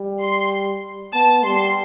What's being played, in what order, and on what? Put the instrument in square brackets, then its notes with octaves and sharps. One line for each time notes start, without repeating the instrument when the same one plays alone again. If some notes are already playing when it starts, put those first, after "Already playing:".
Already playing: [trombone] G3
[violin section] C6
[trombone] B3 [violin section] A5
[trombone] G3 [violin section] C6